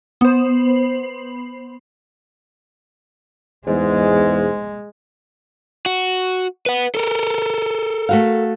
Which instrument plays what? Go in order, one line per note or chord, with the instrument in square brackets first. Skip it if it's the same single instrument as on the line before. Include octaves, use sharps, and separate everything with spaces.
[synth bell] B3 C5
[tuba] E2 [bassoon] G#2 [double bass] G#3
[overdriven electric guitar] F#4
B4 F#5
A4 A#4
[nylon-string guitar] A3 F#4 F5